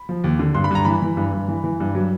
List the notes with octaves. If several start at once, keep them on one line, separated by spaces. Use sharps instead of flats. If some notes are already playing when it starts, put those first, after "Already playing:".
Already playing: B5
F3
D#2
D3
G2 C6
B5
G2 A#5
E3 B5
E3
G2
G2
E3
E3
G2
F#3